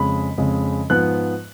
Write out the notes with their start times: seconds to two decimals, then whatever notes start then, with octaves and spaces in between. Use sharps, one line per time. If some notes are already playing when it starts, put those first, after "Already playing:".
Already playing: F2 C#3 G#3 B5
0.37 F2 C#3 G#3
0.90 G#2 F3 B3 F#6